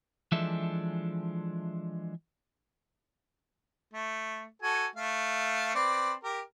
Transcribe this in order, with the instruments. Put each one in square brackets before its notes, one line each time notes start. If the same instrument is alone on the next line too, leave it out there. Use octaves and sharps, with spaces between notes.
[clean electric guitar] E3 F3 G#3 D4 A4 E5
[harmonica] A3
F#4 A4 G#5
A3 F5
C4 B4 D5
G4 A#4